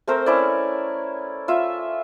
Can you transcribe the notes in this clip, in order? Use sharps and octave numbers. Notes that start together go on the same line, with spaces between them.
A3 C4 A#4 C5
C#4 E4 D5
F4 E5